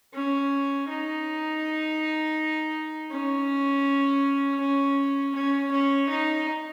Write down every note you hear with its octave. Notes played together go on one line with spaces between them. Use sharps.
C#4
D#4
C#4
C#4
C#4
C#4
D#4